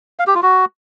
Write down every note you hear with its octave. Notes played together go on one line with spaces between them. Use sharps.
F5
G4
F4
F#4